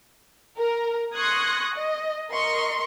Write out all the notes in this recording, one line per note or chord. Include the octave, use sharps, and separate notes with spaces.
A#4
C6 C#6 D#6 F#6 G#6 A#6
D#5
A#4 D#5 C6 C#6